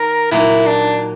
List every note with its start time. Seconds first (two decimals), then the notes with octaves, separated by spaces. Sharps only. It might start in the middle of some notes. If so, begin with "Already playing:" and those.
Already playing: D#3 A#4
0.31 A#2 F#3 A#3 D#4 E4
0.67 D4